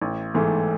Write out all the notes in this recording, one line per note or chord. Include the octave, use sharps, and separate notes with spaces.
A1
G#2 E3 A3